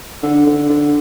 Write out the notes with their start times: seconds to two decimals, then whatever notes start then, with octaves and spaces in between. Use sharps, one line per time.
0.23 D3
0.47 D3
0.69 D3